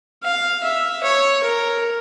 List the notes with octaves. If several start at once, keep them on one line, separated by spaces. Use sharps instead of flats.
F5
E5
C#5
A#4